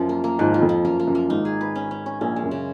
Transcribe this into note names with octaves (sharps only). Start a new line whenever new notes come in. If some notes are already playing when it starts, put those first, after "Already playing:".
Already playing: F#2 F3
A#3
A#3
G#1 G#2 F3
F3
F2
F3
F#2 A#3
A#3
F#2
A#3
G#1 G#2 D#4
G#4
B4
C#4
C#4
C#4
A#1 A#2 C#4
G#3
F#2
C#3